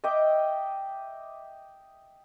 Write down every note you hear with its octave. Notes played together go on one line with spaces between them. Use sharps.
D#5 E5 G5 D6